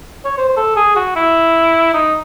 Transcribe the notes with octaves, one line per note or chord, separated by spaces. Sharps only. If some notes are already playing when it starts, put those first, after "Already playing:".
C#5
C5
C5
A4
G#4
F#4
E4
D#4